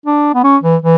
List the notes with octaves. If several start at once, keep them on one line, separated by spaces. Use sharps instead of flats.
D4
B3
C#4
E3
E3